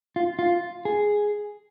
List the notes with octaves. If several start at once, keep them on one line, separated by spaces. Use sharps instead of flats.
F4
F4
G#4